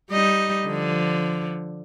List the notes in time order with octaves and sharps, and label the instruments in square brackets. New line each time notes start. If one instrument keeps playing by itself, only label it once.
[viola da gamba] G3 D#4 D#5
D3 F3